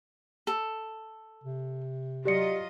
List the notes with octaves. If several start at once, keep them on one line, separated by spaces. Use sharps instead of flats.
A4
C3
F#3 F4 G4 D5 D#5 C#7